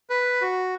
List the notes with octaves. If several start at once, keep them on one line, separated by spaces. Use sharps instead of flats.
B4
F#4